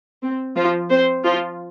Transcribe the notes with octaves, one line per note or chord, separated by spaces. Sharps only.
C4
F3 F4
C4 C5
F3 F4